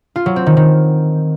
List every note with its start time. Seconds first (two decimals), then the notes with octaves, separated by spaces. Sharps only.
0.16 F4
0.26 F#3
0.36 C4
0.46 D#3
0.57 D#3